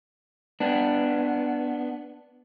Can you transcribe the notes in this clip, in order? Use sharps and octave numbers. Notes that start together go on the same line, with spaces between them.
B3 D4